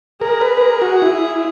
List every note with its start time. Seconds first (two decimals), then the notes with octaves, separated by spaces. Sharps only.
0.21 G#4 A#4
0.41 B4
0.57 B4
0.61 A#4
0.82 F#4
1.02 E4